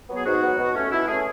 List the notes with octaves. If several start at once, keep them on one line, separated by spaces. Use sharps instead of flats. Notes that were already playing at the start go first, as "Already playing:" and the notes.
F#3 B3
G#4
G#2 F#4
F#3 B3
B2
A3 C#4
B2 E4
A3 C#4 G#4